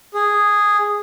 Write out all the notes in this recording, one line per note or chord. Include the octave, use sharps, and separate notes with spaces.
G#4